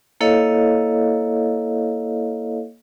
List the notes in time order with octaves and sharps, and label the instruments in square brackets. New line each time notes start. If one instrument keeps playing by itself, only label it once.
[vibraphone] A#3 E4 A4 C#5 D#5 F5